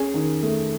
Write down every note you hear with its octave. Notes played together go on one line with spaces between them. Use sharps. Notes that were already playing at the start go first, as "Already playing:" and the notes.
Already playing: C#4 G#4
D#3
A3